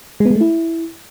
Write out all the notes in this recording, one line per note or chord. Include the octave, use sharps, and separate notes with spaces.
G#3
B3
G#3
A3
E4